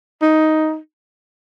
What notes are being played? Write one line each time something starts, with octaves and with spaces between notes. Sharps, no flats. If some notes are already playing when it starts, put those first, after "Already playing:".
D#4